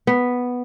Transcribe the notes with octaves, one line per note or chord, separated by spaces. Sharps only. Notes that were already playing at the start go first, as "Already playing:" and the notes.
B3